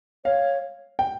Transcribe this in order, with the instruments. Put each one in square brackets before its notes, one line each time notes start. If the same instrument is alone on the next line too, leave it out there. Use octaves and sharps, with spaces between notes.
[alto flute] C#5 [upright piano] F5
[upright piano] G5